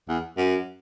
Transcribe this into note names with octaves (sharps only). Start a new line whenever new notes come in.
E2
F#2